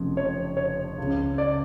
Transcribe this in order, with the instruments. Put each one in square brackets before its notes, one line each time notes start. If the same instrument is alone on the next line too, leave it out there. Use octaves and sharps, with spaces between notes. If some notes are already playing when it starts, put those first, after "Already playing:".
Already playing: [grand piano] F1 F2 C#3
C#5
C#5
C#2 C#3
D5